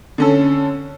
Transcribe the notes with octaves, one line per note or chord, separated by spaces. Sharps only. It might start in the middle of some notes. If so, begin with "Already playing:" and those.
D3 C#4 A4